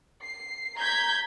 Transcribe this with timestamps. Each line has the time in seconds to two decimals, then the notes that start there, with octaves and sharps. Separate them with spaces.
0.22 C7
0.78 A#5 G6 G#6 B6